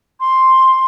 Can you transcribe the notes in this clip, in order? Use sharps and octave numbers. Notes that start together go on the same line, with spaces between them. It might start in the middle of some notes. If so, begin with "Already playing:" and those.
C6